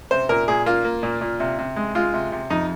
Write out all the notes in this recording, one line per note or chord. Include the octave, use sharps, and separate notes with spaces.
C3 C5
A#2 A#4
A#2 G#4
A#3 F4
A#3
A#2
A#2
C3
C3
G#3
G#3 F4
C3
C3
F2 D#4